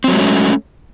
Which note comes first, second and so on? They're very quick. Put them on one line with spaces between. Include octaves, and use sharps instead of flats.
C4 F#3 G#3 A3 C#4